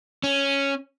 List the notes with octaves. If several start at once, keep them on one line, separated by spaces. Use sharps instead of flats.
C#4